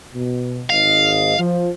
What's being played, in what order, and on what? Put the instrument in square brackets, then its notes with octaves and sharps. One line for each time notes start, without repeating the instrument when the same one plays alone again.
[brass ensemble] B2
[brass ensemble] G#1 G#2 D#5 [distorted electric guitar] F5
[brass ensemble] F3